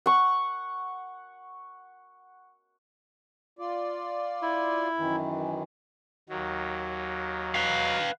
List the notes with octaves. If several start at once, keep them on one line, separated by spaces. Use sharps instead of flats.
F#5 C#6
F4 D5
E4
F#2 D#3 E3
D#2 D#3 F#3
B4 F5